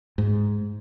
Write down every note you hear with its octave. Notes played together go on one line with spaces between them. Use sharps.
G#2